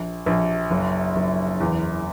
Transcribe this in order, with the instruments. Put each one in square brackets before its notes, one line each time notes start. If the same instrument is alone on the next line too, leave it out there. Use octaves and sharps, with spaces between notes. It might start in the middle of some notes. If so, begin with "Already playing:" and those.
Already playing: [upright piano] A#1
A#1
F#1
F#1
E2